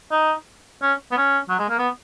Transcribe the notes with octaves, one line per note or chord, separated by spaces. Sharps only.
D#4
C#4
B3
C#4
F#3
G#3
A#3
B3